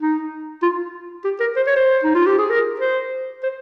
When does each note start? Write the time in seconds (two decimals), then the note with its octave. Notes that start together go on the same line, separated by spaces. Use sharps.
0.01 D#4
0.63 F4
1.25 G4
1.40 A#4
1.56 C5
1.67 C#5
1.76 C5
2.04 D#4
2.15 F4
2.27 G4
2.38 G#4
2.50 A#4
2.80 C5
3.43 C5